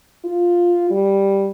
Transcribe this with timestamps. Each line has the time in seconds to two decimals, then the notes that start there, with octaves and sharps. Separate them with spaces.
0.24 F4
0.90 G3